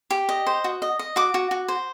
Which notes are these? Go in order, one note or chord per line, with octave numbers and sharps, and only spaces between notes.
G4
D#5
C5
F#4
D#5
D#5
F#4 D6
F#4
F#4
C5